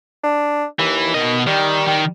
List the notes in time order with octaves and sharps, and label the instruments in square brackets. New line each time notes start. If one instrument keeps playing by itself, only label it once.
[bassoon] D4
[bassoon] D#2 [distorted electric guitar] E3
[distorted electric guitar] B2 D#5 [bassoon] D#3
[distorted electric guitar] D#3 [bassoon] G3
[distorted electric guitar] D#3